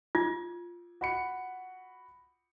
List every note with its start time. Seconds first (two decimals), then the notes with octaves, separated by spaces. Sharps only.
0.15 F4 G#6
1.01 F#4 B5 C#7